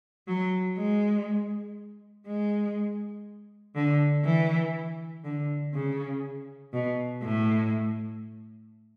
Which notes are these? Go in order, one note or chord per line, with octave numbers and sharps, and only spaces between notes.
F#3
G#3
G#3
D3
E3
D3
C#3
B2
A2